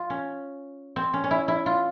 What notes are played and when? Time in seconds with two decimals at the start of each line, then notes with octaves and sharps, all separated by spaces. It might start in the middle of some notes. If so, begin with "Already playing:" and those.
Already playing: F4
0.10 C#4
0.96 C4
1.13 C#4
1.24 C#4
1.31 E4
1.48 E4
1.66 F4